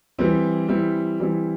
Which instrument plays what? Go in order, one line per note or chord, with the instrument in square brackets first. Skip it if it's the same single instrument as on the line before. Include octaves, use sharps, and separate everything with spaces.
[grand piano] E3 G3 C4 E4
E3 G3 C4 E4
E3 G3 C4 E4